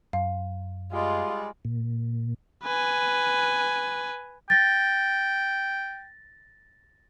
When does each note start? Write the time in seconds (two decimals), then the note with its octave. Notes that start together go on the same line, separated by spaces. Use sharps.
0.13 F#2 F5
0.93 G3 G#3 F4
1.65 A#2
2.63 B4 G#5
4.50 G5 A6 A#6